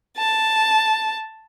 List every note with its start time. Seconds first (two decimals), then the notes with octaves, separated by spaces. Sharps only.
0.18 A5